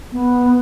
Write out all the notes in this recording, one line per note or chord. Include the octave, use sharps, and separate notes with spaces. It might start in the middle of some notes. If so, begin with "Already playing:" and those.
B3